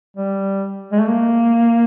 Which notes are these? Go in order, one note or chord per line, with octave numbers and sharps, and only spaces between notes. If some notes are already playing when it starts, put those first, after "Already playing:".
G3
G#3
A3
A#3